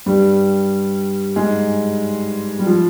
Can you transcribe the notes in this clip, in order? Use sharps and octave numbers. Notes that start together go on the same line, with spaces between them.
G2 G3
G#2 G#3
G3
F3